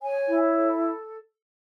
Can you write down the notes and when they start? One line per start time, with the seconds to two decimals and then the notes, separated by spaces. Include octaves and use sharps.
0.03 C#5 G#5
0.28 E4
0.54 A4